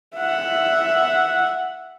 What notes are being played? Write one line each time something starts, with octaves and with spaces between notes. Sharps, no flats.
E5 F#5